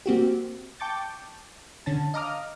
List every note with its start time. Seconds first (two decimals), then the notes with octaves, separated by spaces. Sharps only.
0.06 A#3 C4 F#4 G4
0.80 G5 A5 C#6 D6 G6 A6
1.86 D3 C#4 A5
2.14 D#5 F5 A#5 D6 D#6 F6